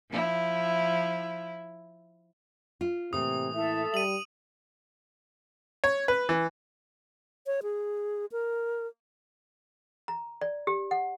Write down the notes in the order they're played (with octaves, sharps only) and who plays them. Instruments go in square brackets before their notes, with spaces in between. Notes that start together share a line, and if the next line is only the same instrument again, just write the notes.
[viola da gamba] F3 E4
[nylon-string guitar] F4
[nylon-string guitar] A2 E3 A#3 [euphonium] C3 [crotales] D#6
[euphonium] E4 [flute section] A4 E5
[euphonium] G3 [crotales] D#7 F#7
[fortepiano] C#5
B4
E3
[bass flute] C#5
G#4
A#4
[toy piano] A#5
D5
G4
F#5